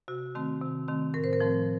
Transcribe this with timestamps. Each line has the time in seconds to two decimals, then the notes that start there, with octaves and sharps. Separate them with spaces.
0.08 C3 F#4
0.35 D#3 A3 C4
0.62 C3
0.88 D#3 A3 C4
1.14 A2 A#4
1.24 C5
1.33 A#4
1.40 F3 A3 C4